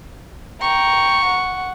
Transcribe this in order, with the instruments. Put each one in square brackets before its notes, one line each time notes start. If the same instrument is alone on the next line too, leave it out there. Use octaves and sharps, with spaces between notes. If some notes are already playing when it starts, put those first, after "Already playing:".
[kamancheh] G5 A#5 [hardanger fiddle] C#6
[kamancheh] F#5